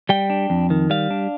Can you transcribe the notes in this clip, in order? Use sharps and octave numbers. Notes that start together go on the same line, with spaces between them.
G3 G5
D4
F2
D#3
G3 F5
D4